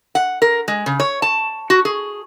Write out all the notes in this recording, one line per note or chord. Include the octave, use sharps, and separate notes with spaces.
F#5
A#4
G#3
C#3
C#5
A5
F#4
G#4